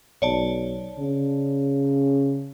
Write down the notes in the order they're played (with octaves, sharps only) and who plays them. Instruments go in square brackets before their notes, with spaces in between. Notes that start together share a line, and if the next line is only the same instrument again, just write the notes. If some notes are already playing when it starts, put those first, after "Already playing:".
[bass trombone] B1 [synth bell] C#5 D5 A5
[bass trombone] C#3